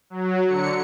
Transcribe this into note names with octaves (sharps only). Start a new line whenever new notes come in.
F#3
D3 C#7